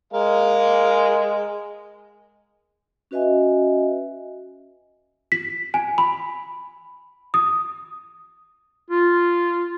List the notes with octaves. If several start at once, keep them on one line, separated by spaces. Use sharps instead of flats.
G#3 A#4 F5
C#4 F#4 B4 D#5 E5 G#5
B6
G#5
B5
D#6
F4